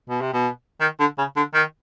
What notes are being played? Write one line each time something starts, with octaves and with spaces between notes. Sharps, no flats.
B2
C3
B2
D#3
D3
C#3
D3
D#3